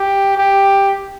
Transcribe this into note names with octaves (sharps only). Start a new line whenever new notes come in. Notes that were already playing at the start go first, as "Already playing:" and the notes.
Already playing: G4
G4